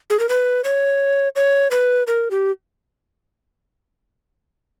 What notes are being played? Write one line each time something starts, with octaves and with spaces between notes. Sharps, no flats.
G#4
A#4
B4
C#5
C#5
B4
A#4
G4